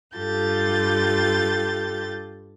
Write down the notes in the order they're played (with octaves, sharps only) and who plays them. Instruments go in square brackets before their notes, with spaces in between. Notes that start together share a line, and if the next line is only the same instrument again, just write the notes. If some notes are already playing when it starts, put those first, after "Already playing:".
[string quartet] G2 F4 G4 A4 G6 A6